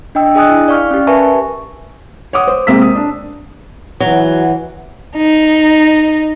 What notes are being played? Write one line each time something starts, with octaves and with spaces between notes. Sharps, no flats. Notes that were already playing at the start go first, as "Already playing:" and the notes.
D4 D#5 G5 E6
D4 G#4 D#5 G#5 D#6 F#6
E4
D5 F5 C#6 F6
C#4 G4
A#4 B4 E5 G#5 A5 C#6
C#5 F#5 D6 D#6
C5
C3 G#3 A#3 C4 E6 B6
D#6
D4
E3 F#3
D#4